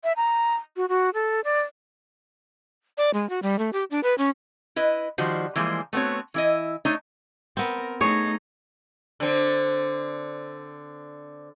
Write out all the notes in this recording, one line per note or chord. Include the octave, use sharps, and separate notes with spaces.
E5
A#5
F#4
F#4
A4
D5
D5
G#3
F#4
G3
A3
G4
D4
B4
C#4
E4 B4 D#5
D#3 F3 G3 F#4 C5
E3 F3 G3 G#3 A#3 C5
A3 B3 C4 F#4 C#5
E3 E4 D#5
A3 D4 D#4 C#5
B3 C4 A#4
A3 D#4 G#4 C#5
D3 C4